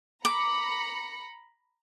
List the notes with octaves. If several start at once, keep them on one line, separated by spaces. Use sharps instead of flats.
A#5 B5 D6 C#7